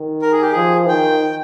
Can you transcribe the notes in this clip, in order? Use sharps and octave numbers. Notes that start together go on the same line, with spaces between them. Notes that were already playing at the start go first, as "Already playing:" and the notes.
Already playing: D#3
A#4
G#4
G4
F3 G#4
D#3 G5